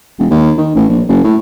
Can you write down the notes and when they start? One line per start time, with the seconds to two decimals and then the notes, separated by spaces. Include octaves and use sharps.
0.19 E1
0.30 D#2
0.58 D#3
0.75 A1
0.89 A#1
1.08 F#1
1.24 A2